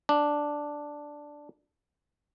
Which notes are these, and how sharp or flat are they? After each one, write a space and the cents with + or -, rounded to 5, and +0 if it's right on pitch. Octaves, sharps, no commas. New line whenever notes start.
D4 +0